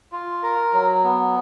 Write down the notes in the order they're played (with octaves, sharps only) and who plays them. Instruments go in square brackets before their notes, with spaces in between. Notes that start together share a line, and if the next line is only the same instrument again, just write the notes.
[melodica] F4
A#4
F#3
B3